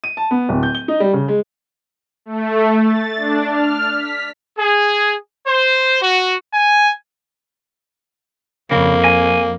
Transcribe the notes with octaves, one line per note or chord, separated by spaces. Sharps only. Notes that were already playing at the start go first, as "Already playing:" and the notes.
D#7
A5
B3
D1
G6
G7
D#4
G3
C#3
G#3
A3
A6
D4
F6
B6
G#4
C5
F#4
G#5
F2 C#3 A#3
G#5